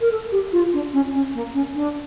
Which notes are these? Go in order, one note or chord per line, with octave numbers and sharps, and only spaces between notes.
A#4
A4
G4
F4
D4
C#4
C#4
A#3
C#4
D4